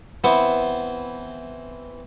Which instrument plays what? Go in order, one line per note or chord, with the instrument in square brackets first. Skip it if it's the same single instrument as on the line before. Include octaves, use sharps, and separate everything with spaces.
[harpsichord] E3 C4 E4 [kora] B3